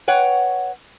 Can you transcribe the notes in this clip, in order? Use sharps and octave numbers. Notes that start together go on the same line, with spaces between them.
B4 C#5 F#5 G5